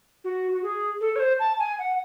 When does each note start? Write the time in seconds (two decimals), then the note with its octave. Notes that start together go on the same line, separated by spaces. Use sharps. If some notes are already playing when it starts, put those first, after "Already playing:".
0.24 F#4
0.52 F#4
0.63 G#4
1.01 A4
1.16 C#5
1.20 C5
1.39 A5
1.59 G#5
1.79 F#5